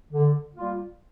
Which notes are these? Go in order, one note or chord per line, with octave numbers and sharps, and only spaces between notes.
D3
G3 A#3 F4